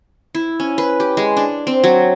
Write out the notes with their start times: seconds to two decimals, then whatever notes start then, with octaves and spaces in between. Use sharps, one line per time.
0.35 E4
0.60 C#4
0.78 B4
1.00 G4
1.17 G#3
1.37 D4
1.67 C4
1.84 F#3